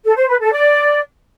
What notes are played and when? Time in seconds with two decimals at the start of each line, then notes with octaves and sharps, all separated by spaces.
0.05 A4
0.17 C5
0.28 B4
0.40 A4
0.52 D5